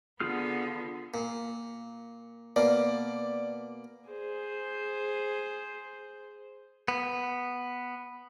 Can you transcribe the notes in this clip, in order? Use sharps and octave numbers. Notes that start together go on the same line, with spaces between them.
D3 B3 F4 G#4 F6
A#2
B2 A#3 D5
G#4 C5
B3